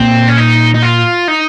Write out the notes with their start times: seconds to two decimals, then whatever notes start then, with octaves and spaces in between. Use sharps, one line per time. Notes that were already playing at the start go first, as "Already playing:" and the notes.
Already playing: A#2 C4
0.28 C#4
0.37 D#4
0.74 D#4
0.82 F4
1.28 D#4